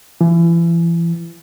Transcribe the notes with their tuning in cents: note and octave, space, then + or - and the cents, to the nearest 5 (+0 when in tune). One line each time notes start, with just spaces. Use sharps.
E3 +35